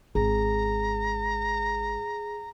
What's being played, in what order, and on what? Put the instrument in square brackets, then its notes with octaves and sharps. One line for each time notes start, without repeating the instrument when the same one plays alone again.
[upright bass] G#1 [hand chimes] G#4 [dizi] A#5